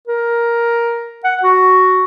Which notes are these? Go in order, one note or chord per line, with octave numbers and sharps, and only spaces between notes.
A#4
F#5
F#4